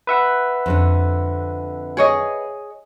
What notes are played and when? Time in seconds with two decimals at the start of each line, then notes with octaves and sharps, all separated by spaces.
0.07 B4 E5 F#5
0.66 F2 D3 D4
1.97 G#4 C#5 D#5